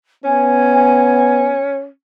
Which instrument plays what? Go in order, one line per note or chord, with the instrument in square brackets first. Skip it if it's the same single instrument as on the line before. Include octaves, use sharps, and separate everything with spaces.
[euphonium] B3 [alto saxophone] C#4 [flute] G#5